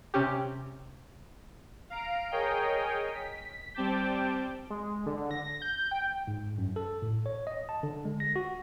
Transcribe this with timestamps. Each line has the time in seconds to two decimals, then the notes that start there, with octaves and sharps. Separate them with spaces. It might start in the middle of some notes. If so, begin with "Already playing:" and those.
0.14 C3 C#4 G4
1.90 F5 A#5 D7
2.31 G#4 A#4 C#5 D#5 G5
3.13 B6
3.74 G3 C4 G5 A5 D6 G6
4.70 G#3
5.06 D3
5.31 A#6
5.62 G6
5.91 G5
6.27 G#2
6.58 F#2
6.76 A4
7.02 A2
7.26 C#5
7.47 D#5
7.69 A5
7.83 D3
8.05 G#3
8.20 A#6
8.36 F#4